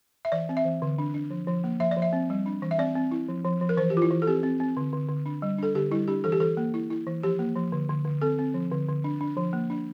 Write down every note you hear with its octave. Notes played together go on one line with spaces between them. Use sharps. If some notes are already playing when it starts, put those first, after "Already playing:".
E5
E3 D5
C4
E5
E3
D3
D4
D4
F3
F3
A#3
F3 E5
D5
F3
E5
C4
G3
D4
E3
E5
C4 D5
C4
E4
F3
F3
F3
A#4
E3 C5
G4
E3 F4
E4
E3
A4
C4 G4
C4
C4
D3
D3
D3
D4
G3
D4 A4
D3 G4
G3 E4
D4 G4
E3 A4
G4
E3 A4
A#3
E4
E4
E3
F3 G4
A#3
F3
D3
D3
D3
C4 A4
C4
F3
D3
D3
D4
D4
F3
A#3
D4